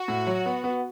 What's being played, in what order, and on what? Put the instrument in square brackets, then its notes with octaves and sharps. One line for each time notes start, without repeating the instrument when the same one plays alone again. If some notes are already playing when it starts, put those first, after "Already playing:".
Already playing: [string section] F#4
[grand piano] A2
F#3
B3
B3